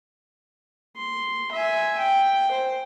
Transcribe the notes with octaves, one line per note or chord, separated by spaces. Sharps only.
C6
E5 G#5
G5
C5